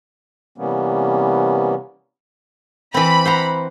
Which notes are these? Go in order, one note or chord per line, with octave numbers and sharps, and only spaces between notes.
C3 E3 G3 A#3 B3 C#4
E3 C4 B5
C5 F#5 A#5